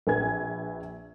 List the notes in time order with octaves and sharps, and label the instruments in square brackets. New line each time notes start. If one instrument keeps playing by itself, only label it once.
[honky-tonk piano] A#1 B4 G#5 G#6